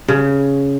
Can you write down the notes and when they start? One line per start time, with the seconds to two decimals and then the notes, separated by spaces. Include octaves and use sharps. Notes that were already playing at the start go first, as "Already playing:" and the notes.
0.08 C#3